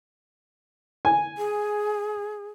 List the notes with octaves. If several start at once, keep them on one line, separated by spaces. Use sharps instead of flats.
G#5
G#4